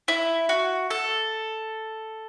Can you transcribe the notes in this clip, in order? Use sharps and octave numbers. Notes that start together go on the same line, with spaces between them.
E4
F#4
A4